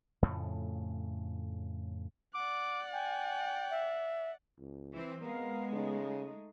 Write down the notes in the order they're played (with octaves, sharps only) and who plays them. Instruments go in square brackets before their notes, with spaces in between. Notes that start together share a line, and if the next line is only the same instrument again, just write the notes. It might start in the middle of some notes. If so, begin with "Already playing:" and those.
[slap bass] F2 A2 C#3 A3
[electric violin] D5 F#5 [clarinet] D6
[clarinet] G5 [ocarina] G#5
[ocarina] E5
[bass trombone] C#2
[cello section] E3 C4
[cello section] G#3 [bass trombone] B3 [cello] A#4 F5
[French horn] C#3 [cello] A3 D#4